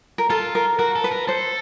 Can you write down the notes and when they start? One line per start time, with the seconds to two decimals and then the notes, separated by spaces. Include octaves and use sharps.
0.18 A#4
0.30 F4 A4
0.55 A#4
0.79 F#4 A#4
0.96 A4
1.04 B4
1.12 A#4
1.28 A4 C5